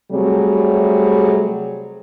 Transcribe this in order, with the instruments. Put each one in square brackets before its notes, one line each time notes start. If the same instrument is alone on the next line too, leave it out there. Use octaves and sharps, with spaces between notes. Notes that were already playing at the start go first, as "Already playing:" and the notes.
[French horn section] C3 F#3 G3 A3 C4 G#4